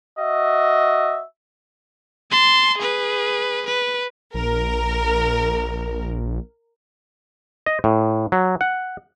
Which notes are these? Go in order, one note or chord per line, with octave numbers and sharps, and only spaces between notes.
F#4 D#5 E5
A5 C6
G#4 B4
B4
A#1 A#4
D#5
A2
F#3
F#5